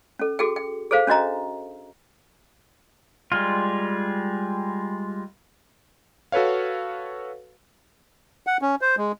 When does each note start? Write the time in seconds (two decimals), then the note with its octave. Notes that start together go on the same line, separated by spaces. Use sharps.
0.19 C#4 A4
0.39 F#4 G#4 A4 G5
0.56 G5
0.91 G#4 A4 C5 F5
1.07 C#4 D4 F#4 D#5 A#5
3.32 G3 G#3 F4
6.32 F#4 A4 B4 C#5 F5
8.47 F#5
8.62 C#4
8.81 C5
8.97 G#3